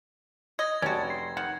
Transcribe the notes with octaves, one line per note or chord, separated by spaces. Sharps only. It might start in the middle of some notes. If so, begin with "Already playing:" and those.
D#5 G#6 A#6
F1 C#4 F#4 D5 A5
C6
D#3 F#5